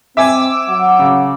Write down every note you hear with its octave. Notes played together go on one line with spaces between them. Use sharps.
C4 E5 G#5 D6 E6
F#3 F#5
C#3